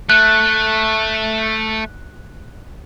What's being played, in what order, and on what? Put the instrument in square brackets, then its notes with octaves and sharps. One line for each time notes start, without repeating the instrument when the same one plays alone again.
[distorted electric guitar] A3 [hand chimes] F#6